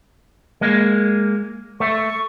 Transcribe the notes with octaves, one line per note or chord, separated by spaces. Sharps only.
G#3 A#3
A3 C#6